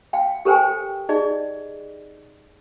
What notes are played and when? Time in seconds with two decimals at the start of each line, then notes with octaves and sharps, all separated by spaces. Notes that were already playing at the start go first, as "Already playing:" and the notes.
0.13 F5 G5
0.45 G4 A4 A#4 C5 G5 G#5
1.09 D#4 G#4 D5 D#5